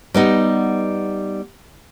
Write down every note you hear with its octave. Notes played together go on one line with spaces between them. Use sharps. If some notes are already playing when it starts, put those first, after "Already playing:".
G3 B3 D#4